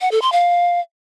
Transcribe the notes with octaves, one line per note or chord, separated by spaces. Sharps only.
F#5
A4
C6
F5